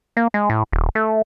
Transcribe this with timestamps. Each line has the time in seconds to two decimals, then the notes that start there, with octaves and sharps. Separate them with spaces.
0.17 A#3
0.34 G#3
0.50 A2
0.72 D#1
0.95 A3